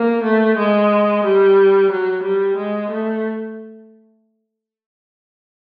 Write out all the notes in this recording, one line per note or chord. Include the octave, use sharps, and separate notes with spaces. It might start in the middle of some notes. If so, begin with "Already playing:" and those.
Already playing: A#3
A3
G#3
G3
F#3
G3
G#3
A3